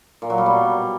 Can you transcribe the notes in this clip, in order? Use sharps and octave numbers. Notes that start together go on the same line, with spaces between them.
A#2
F#3
G3
B2